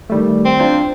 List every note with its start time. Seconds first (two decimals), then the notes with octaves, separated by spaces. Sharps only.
0.10 D#3 G3 A3
0.45 C4
0.60 D4 F4 C5